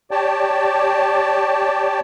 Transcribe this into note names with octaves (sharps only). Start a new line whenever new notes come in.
G4 C#5 D5 G5 A5